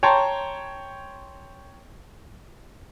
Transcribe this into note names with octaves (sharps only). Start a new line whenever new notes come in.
C#5 G5 A5 A#5 C6